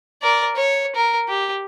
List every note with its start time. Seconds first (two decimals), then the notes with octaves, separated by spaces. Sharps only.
0.22 A#4 D5
0.56 C#5
0.95 A#4
1.28 G4